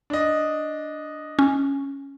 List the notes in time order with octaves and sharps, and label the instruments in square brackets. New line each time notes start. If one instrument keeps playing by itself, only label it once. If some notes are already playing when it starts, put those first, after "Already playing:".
[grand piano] D4 D#5
[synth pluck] C#4